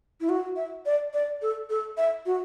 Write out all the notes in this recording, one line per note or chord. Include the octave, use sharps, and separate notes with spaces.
E4
F#4
E5
D5
D5
A4
A4
E5
F#4